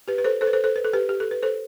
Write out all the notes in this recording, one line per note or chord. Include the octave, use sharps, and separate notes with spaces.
G4 B4
B4
A4 C5
A4 C5
B4
A4 C5
A4 C5
B4
A4
G4 B4
G4
A4
B4
A4 C5